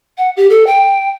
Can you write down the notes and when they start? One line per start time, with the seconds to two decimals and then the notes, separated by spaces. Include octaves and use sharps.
0.18 F#5
0.37 G4
0.50 A4
0.67 G5